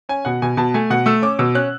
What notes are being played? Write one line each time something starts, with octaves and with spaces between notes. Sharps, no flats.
C#4 G#5
B2 F#5
B2 G#5
B2 A5
A3 G#5
B2 F#5
A3 E6
C#4 D6
B2 E6
C#4 F#6